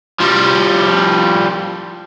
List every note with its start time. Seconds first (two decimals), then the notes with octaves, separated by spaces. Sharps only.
0.20 F3 G3